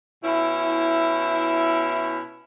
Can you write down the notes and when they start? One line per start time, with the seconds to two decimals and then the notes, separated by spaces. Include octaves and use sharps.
0.24 B2 C#4 E4